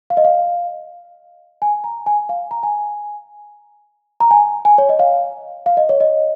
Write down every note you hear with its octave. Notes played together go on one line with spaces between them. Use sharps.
F5
D#5
F5
G#5
A#5
G#5
F5
A#5
G#5
A#5
G#5
G#5
C#5
D#5
F5
F5
D#5
C#5
D#5